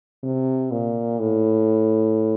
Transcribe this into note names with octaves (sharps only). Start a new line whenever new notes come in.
C3
A#2
A2